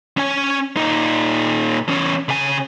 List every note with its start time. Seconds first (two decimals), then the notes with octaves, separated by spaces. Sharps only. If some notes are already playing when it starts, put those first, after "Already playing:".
0.18 C#4 G#5
0.77 A#2 D#4
1.88 E2 C#4
2.29 C#3 G#5